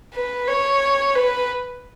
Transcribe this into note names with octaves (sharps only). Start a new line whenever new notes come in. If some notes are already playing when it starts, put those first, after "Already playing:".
B4
C#5
B4